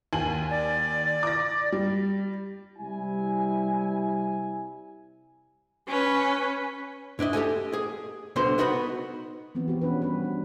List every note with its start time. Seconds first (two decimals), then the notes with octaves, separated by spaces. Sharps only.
0.13 D#2 G#5 F#7
0.50 D5
1.23 D6 A#6
1.72 G3
2.78 C3 G3 E4 G#5
5.88 C#4 B4
7.19 G2 D4 E4 D#5
7.33 G4 A4 D#5 G#5
7.73 G#4
8.36 C2 B2 D3 B4 C5 C6
8.58 B3 D#4 F#4 B4 G#5 B5
9.55 E3 F3 B3 C4
9.68 F#4 G4
9.82 C#4 D4 B4
10.02 G3 F#4 B4
10.24 D4